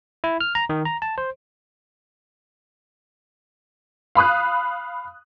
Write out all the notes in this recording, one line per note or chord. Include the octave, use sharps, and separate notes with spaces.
E4
F6
A#5
D#3
A#5
A5
C5
F5 B5 D#6 F#6